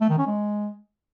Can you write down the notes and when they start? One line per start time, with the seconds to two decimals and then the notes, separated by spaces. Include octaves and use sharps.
0.01 A3
0.10 D#3
0.18 C#4
0.27 G#3